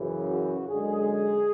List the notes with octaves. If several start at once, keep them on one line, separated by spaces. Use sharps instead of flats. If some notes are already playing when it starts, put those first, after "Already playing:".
Already playing: F#2 C#3 E3
F#4
F#2 D3 G#3 G#4